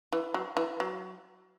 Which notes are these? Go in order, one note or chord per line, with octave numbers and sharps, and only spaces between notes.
E3
F#3
E3
F#3